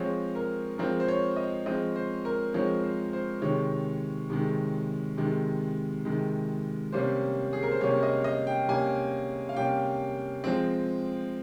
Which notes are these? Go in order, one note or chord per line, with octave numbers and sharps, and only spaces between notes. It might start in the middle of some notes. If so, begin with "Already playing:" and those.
Already playing: F3 G#3 C4 C#5
A#4
F3 G#3 C4 A#4
C5
C#5
D#5
F3 G#3 C4 D#5
C5
A#4
F3 G#3 C4 C#5
C5
C5
C3 D#3 G#3 C#5
C3 D#3 G#3
C3 D#3 G#3
C3 D#3 G#3
C3 G3 A#3 C#4 C5
G#4
A#4
C5
C3 G3 A#3 C#4 C#5
D#5
D#5
G5
C3 G3 A#3 C#4 G#5
F5
C3 G3 A#3 C#4 G5
F3 G#3 C4